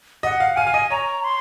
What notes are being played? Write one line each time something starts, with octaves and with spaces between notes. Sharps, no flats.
D#5 F#5
F5
F5 G#5
F5
D#5
C#5 A#5
C6